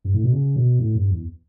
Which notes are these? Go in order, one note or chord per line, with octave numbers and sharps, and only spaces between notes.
G2
A2
B2
C#3
B2
A2
G2
E2